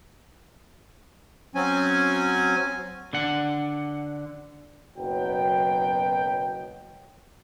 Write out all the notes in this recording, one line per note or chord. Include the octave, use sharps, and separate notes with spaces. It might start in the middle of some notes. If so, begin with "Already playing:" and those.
F#3 C4 C#4 G#5
D3 F#5
F#1 B2 F#3 B3 G5